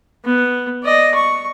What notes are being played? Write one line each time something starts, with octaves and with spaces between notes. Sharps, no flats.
B3
D5 D#5
C#6